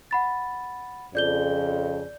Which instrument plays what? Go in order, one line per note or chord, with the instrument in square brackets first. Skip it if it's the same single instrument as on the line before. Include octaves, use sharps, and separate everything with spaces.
[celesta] F#5 B5 A6
[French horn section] F2 C#3 [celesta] D5 G6 G7